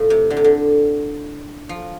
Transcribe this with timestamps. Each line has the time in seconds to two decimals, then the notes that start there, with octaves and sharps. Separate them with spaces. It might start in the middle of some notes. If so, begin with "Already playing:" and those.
Already playing: A2 F3
0.10 C3
0.30 D3
0.37 C3
0.44 D3
1.69 F3